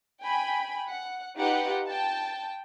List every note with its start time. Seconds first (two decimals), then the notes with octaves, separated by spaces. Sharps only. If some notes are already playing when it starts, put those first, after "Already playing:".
0.23 G5 G#5 B5
0.88 F#5
1.37 D#4 F4 G4 B4 F#5
1.88 G5 A5